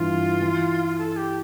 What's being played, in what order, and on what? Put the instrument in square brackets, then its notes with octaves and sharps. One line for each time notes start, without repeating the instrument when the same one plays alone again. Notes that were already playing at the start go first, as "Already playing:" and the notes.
Already playing: [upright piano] G2 E3 [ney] F4
[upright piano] E3
[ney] A4
G4